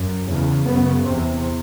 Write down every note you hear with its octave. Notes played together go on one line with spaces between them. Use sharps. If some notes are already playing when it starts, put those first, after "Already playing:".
Already playing: F#2
E2 C#3
F#2 C#3 B3
E2 C3 C4